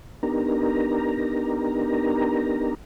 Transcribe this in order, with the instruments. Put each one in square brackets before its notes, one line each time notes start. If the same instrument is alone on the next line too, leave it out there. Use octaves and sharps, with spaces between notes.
[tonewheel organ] B3 D4 D#4 G4 A#4 A#5